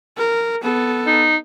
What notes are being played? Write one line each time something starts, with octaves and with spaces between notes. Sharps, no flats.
A#4
B3 A4
D#4